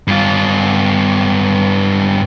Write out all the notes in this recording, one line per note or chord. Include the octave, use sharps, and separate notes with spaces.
G2 F4